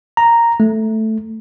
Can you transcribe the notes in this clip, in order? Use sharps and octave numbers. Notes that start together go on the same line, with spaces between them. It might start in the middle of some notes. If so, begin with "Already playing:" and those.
A#5
A3